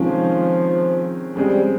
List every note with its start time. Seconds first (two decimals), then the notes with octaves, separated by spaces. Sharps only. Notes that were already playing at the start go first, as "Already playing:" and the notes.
Already playing: C3 D#3 F3 G#3 C#4
1.35 F2 C#3 G3 G#3 C4